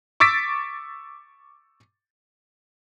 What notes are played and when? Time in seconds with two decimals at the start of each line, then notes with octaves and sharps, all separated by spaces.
0.20 C#6 D6 E6 A6 B6 D7